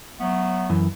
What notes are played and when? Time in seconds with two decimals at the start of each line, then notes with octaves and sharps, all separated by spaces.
0.20 F#3 A3 B3
0.69 F#2 E3